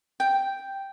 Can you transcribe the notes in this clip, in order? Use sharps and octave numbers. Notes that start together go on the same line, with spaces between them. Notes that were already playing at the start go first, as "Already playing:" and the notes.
G5